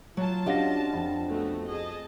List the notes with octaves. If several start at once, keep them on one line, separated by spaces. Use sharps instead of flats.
F#3 F4 A5
C#4 D4 F#4 G4 D#5 F5 F#5 A#6
F2
A3 B3 F#4
G#4 D#5 A5